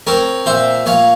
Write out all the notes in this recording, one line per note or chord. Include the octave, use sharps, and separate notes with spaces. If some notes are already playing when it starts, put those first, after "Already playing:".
C4 A#4 C#5
A#2 C5 E5
A#2 C#5 F5